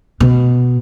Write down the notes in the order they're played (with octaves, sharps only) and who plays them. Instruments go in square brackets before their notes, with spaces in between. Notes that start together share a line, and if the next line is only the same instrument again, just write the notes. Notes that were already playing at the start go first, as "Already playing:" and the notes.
[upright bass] B2